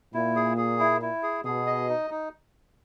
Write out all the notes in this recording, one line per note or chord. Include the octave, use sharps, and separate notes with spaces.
A#2 E4
G#4
G#4
E4
E4
G#4
B2 G#4
D#5
D#4
D#4